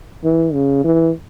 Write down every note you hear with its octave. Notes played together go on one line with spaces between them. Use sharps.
E3
C#3
E3